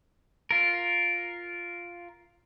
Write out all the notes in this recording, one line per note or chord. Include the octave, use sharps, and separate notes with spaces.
F4 A#4